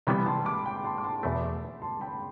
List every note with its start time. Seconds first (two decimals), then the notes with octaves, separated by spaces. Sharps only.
0.07 C3 E3 G3 B3 G5 B5
0.26 A5 C6
0.46 B5 D6
0.65 G5 B5
0.84 A5 C6
0.98 D6
1.04 A5 C6
1.23 E2 B2 A3
1.82 A5 C6
2.01 G5 B5